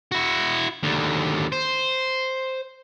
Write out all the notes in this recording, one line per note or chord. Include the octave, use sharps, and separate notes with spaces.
E4 F#4
D#2 D3
C5